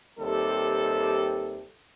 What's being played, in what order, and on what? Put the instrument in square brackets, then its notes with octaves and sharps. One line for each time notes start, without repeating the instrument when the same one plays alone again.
[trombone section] D#2 C3 G3 A4